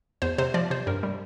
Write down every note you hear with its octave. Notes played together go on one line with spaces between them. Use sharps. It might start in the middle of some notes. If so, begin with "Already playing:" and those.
E2 C5
C3 C5
F3 D5
C3 C5
G2 A#4
G3